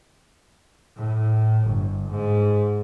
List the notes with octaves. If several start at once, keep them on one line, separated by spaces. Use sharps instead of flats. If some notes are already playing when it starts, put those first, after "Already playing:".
A2
G1
G#2